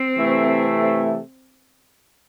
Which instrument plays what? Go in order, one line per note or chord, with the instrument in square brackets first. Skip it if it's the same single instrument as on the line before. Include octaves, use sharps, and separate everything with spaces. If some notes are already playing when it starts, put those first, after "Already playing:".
Already playing: [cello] C4
[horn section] C3 E3 A3